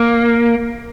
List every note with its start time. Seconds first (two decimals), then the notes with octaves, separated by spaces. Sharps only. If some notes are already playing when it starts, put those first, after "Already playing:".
Already playing: A#3